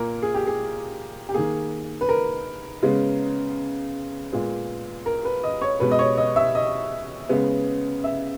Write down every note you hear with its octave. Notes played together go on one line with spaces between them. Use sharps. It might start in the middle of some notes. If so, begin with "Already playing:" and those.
Already playing: A#2 A#3 A#4
G#4
G4
G#4
G4
D#3 A#3 G#4
B4
A#4
C#3 G#3 B3
A#2 G#3 B3
A#4
B4
D#5
C#5
B2 G#3 B3 B4
D#5
C#5
D#5
E5
D#5
C#3 G#3 B3
E5